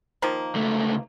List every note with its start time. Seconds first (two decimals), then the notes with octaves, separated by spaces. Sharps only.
0.22 D#3 F3 A#3
0.55 C#2 A3